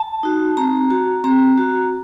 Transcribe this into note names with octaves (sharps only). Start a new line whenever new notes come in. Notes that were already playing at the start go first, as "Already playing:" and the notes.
Already playing: A5
D#4 F#4
C4 A#5
F#4
C4 A#5
F#4